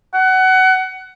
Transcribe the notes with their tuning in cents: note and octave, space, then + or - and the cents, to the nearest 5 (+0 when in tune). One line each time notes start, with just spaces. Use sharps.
F#5 +20